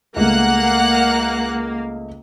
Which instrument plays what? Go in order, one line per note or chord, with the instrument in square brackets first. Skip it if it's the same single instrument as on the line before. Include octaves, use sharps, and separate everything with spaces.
[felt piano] C#2 A3 [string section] A#3 [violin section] F#5 F#6